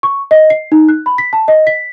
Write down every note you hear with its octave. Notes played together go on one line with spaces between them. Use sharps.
C#6
D#5
C7
D#4
F#6
B5
B6
A5
D#5
B6